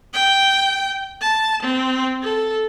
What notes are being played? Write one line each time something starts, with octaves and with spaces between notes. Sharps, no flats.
G5
A5
C4
A4